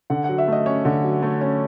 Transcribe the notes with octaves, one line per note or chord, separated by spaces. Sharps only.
D3 F#5
F#3 F#5
E5
A3 D#5
C#4 C#5
D3
F#3
A3
C#4